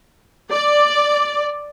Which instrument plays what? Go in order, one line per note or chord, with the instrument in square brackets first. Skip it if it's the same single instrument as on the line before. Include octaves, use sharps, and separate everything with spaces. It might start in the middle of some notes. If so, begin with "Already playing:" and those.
[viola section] D5